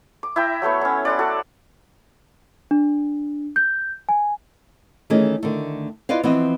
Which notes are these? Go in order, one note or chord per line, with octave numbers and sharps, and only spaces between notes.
D6
E4 E5 G5 A#5
F#3 A3 B3 C#5
F#3 C#4
D5 F#5 C6
F#4 A4
D4
G6
G#5
D#3 E3 A3 C#4 G#4 D#5
D3 D#3 A3
E4 F4 B4 D5 D#5 F5
E3 F3 B3 C4 D#5